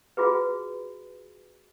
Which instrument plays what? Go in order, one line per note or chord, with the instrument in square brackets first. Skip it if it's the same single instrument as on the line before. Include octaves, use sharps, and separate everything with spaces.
[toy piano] F4 F#4 G#4 B4